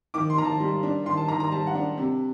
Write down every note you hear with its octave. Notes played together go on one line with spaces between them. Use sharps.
D#3 D6
C6
D#3 A#5
A5
G3
D4
D#3 C6
A5
D#3 A#5
A#5
G3 A5
F#5
D4
C3